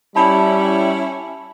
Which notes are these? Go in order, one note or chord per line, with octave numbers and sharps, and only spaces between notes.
G3 C#4 E4 A5 B5